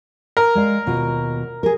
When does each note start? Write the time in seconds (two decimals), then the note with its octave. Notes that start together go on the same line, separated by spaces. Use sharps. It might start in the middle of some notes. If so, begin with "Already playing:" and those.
0.37 A#4
0.55 G#3 D5 F5
0.86 D#2 B2 F4
1.63 G#4 A#4